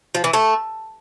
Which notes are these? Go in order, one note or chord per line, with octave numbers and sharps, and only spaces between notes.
F3
E3
A3